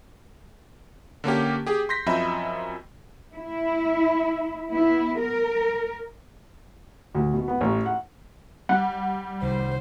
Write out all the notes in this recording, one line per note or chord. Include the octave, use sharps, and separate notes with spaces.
D3 A#3 C#4 G4
G4 G#4
C6 G6 A#6 B6
F#2 F3 C4 D#5 E5 B5
E4
B3 E4
A#4
D2
B2
B3
A1
F#5
G3 F#5
C2 D#3 C5